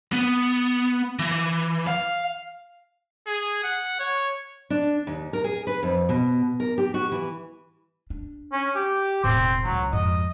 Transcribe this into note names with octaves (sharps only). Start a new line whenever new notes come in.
B3
E3
F5
G#4
F#5
C#5
D4
D#2
A#4
G#4
B4
F2
B2
A#4
G4
F#4
E3
D4
C#4
G4
E1 A2 C4
C#2 F#3
F2 G#2 D#5